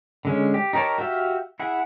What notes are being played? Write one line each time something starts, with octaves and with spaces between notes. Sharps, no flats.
D3 G#3 C#4
G4
D#4 G4 A#4 C#5 A5
F#4 G4 E5 F5
E4 G#4 F#5